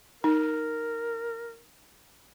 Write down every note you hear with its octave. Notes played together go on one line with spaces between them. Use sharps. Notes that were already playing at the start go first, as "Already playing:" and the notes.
D#4 A#4